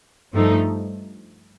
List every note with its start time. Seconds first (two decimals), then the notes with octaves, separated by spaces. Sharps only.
0.33 G2 F3 A3 D#4